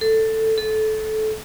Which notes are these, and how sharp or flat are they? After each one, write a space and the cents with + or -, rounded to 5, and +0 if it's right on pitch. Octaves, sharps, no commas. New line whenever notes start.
A4 +10
A4 -20